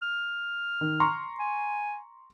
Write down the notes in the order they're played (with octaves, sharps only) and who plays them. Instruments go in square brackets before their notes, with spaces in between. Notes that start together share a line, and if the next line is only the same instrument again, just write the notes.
[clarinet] F6
[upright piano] D#3
A#5 C6 C#6
[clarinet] G#5